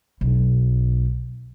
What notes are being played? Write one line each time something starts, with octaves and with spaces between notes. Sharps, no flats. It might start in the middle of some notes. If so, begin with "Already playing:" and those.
B1